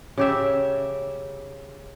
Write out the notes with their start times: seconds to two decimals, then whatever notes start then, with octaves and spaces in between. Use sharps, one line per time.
0.18 C#3 G4 E5